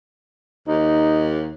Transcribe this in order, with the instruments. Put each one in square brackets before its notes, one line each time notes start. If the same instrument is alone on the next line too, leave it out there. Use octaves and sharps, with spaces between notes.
[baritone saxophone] D#2 [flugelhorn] D#4